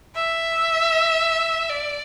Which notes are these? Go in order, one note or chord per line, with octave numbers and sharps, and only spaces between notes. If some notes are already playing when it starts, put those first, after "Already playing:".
E5
D5